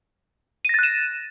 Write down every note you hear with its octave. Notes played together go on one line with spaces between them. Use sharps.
F#6 A6 A#6 D#7 E7